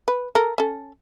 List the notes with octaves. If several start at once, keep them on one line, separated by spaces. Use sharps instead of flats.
B4
A4 A#4
C#4 A4